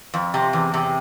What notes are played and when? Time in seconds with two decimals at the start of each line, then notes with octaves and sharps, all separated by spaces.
0.14 F2
0.34 C3
0.53 E2
0.74 C3